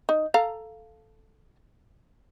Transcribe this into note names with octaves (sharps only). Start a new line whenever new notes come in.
D#4
A4 F5 A#5